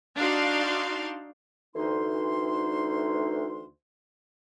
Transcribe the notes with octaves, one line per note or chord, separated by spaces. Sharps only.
D4 D#4 F#4 D5 F5 C6
D2 E3 D#4 C6